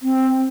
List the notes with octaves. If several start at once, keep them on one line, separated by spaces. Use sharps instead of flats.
C4